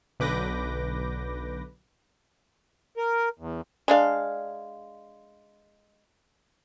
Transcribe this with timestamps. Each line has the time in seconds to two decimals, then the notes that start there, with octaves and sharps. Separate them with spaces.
0.20 B1 D3 B4 D6 G6 A#6
2.97 A#4
3.39 E2
3.88 G#3 D4 F5